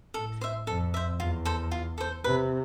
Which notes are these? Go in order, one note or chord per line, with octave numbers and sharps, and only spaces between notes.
A2 A4
C5 E5
F2 A4
C5 E5
E2 F4
A4 C5
F4
A4 C5
C3 B4